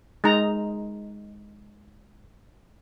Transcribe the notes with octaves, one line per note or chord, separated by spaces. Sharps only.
G#3 D#4 A#5